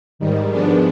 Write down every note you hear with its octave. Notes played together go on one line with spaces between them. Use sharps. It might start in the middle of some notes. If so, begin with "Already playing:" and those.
G#2 D#3 G3
G#2 F3 G#3 B3 D4